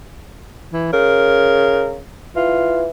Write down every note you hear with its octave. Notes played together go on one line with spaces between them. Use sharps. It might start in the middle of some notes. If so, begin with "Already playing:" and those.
E3
C#3 A#4
E3 F4